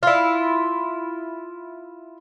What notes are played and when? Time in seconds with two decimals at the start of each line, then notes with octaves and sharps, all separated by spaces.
0.03 E4 F4